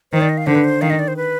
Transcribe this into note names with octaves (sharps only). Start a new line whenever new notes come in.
D#3 C5
D5
D#5
F5
D3 C5
B4
C5
D#3 F5
D#5
D5
C5
B4